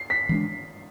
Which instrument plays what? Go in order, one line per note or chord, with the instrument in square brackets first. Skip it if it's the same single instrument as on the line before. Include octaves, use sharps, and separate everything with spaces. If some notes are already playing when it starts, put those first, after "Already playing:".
Already playing: [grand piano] C7
B6
[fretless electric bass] E3 G#3 B3
D4